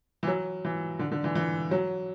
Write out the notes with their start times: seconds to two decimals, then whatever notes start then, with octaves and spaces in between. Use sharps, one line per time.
0.23 E3
0.27 F#3
0.65 E3
0.99 D3
1.11 D3
1.24 E3
1.35 E3
1.71 F#3